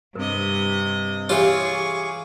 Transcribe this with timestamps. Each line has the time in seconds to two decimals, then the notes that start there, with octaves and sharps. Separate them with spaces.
0.15 G2 C3 A#4 D#5
1.29 E3 F4 G4 G#4 C#5 C#6 D6